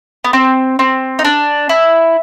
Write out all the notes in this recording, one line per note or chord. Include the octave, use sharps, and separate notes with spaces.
B3
C4
C4
D#4
D4
E4